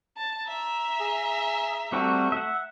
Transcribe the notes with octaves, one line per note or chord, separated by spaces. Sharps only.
A5
E5 A#5
G#4
G3 A3 C4 F#4
E5 F#5